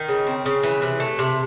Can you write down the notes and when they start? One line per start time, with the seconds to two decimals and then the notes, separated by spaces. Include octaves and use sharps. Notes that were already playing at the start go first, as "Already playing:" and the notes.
Already playing: D#3
0.08 C#3
0.27 C4
0.45 C#3
0.63 E3
0.82 C3
1.00 A3
1.19 C3